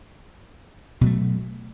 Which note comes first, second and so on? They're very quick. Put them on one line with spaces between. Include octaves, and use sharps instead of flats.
B2 F#3 A3